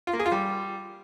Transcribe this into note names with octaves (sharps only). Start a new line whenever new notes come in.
F4
A#3
G#4
F4
G3